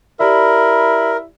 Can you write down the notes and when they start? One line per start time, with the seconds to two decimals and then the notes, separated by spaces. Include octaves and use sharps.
0.20 E4 G4 A#4 D5 B5